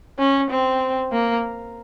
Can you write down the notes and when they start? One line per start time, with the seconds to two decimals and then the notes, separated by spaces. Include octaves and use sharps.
0.19 C#4
0.50 C4
1.12 A#3